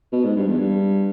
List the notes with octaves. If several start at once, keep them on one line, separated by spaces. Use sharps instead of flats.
B2
G#2
G2
E2
G2